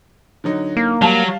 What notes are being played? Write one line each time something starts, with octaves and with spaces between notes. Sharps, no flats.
D3 F#3 D#4
A#3
F#3 G3 F5 A5